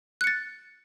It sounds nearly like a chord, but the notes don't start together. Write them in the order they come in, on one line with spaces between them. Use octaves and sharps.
F#6 C#7 A6